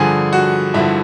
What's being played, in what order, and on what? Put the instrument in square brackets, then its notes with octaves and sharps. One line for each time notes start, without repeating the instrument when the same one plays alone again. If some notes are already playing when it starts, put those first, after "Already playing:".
Already playing: [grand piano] G2 D3 F3 G#4 G#5
F#4 F#5
G2 D3 F3 E4 E5